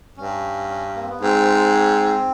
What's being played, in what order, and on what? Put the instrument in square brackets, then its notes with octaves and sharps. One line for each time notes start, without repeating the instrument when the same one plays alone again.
[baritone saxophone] G2 [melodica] C#4
[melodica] C#4
A#3
C4
B3
[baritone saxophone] G#2 [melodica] C4